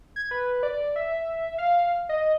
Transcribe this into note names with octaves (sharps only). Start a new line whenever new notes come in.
G#6
B4
D5
E5
F5
D#5